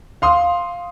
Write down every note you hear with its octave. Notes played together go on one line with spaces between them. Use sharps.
F5 C6 D#6